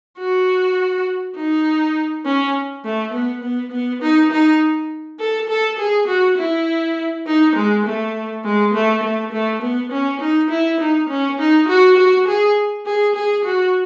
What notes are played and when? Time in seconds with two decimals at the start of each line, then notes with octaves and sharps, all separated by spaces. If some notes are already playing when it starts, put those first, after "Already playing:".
0.18 F#4
1.36 D#4
2.26 C#4
2.85 A3
3.14 B3
3.43 B3
3.72 B3
4.02 D#4
4.31 D#4
5.19 A4
5.49 A4
5.79 G#4
6.08 F#4
6.38 E4
7.27 D#4
7.56 G#3
7.85 A3
8.44 G#3
8.74 A3
9.03 A3
9.32 A3
9.62 B3
9.92 C#4
10.21 D#4
10.50 E4
10.80 D#4
11.09 C#4
11.39 D#4
11.68 F#4
11.97 F#4
12.28 G#4
12.86 G#4
13.15 G#4
13.45 F#4